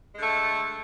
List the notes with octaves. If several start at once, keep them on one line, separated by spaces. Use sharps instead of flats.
D3 G#3 A3